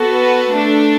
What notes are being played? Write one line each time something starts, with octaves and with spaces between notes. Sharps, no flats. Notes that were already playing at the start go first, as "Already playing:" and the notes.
Already playing: B3 F#4 A4
B4
A3 D4 A4